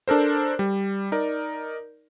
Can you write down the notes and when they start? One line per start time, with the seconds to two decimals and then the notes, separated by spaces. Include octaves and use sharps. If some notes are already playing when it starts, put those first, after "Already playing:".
0.08 D4 A4 A#4 C5
0.59 G3
1.12 D#4 A#4 D5